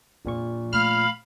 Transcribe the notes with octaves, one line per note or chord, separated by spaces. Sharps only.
A#1 F2 A#2 F3 C#6
A3 F5 B5 F6